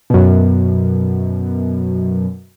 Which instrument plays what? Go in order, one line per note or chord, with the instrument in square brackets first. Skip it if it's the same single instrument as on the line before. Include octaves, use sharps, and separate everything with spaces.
[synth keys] F#2 B2